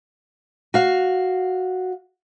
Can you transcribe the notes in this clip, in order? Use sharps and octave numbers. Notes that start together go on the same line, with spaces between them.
F#4 F5